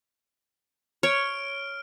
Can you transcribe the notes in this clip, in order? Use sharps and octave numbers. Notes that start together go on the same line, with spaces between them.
C#5 F6 D7